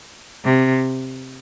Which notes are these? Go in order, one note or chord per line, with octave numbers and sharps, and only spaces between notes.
C3